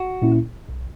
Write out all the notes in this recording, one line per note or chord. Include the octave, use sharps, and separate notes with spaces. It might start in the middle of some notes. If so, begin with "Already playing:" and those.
Already playing: F#4
A#2 A#3 C#4 E4
B1